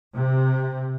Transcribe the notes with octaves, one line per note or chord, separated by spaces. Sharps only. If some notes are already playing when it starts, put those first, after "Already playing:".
C3